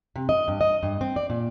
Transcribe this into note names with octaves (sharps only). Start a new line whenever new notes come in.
C3
D#5
G2
D#5
G2
C4
D5
A#2